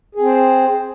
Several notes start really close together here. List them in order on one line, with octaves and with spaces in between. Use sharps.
G#4 C4 C5